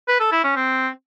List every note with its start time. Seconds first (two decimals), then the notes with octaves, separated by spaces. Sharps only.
0.08 B4
0.20 A4
0.32 E4
0.44 C#4
0.56 C4